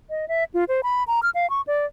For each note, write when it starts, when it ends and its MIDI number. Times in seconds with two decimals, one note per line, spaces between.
0.10 0.28 75
0.28 0.44 76
0.54 0.64 65
0.69 0.81 72
0.83 1.03 83
1.07 1.20 82
1.23 1.30 89
1.35 1.49 77
1.50 1.61 85
1.67 1.86 74